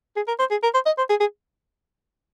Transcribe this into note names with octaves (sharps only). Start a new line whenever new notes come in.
G#4
A#4
C5
G#4
A#4
C5
D#5
C5
G#4
G#4